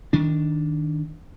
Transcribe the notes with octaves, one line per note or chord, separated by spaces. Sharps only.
D#3 D4